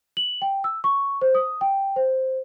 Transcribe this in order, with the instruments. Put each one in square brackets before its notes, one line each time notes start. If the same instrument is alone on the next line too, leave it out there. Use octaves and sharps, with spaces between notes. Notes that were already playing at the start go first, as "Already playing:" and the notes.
[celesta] F#7
G5
E6
C#6
C5
D#6
G5
C5